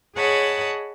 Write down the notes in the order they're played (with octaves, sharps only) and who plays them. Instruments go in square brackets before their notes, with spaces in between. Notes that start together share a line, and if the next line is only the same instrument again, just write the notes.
[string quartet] G#4 C#5 D#5 F#5 A5 B5